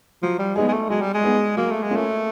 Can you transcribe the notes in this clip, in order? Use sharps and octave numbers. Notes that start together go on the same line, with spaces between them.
F3 F#3
G3
G#3 B3 D#4 G#4
G#3
A3
F#3 G#3
G3
G#3
B3 D#4 G#4
F#3 A#3
A3
G#3
A#3 C#4 F4
A3